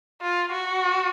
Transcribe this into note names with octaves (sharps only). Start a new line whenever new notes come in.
F4
F#4